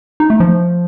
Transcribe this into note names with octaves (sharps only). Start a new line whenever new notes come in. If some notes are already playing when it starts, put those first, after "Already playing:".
D#4
A3
F3